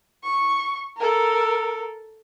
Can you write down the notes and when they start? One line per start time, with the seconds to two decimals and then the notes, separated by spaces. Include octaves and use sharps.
0.23 C#6
0.97 A4 A#4